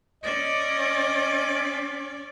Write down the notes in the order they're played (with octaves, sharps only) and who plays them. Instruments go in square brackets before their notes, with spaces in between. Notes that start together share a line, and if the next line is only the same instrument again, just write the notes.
[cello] C#4 D5 [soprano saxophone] D#5